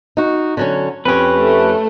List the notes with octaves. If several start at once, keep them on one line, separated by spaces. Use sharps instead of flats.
D#4 F#4
D3 F#3 C#4
F2 C#4 G4 B4
A3